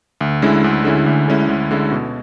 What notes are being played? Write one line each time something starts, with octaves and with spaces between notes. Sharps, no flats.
D2
D3 G#3 C#4 E4
D2
D3 G#3 C#4 E4
D2
D3 G#3 C#4 E4
D2
D3 G#3 C#4 E4
B2